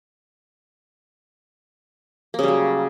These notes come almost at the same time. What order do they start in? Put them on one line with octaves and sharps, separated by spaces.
A#3 C#3 G3 F#3